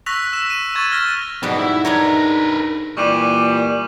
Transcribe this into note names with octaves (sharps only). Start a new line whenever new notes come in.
C#6 E6 F#6 A#6 B6 F7
E6 E7
D#7
C#6 G#6 A6
F6 A#6 G7
G#2 B2 G3 B3 F#4
E4
D4 D#4 A#4 B4 C#5
A#2 E3 G3 C#6 D6 D#7